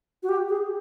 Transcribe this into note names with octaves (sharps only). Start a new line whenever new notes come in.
F#4
G4
G#4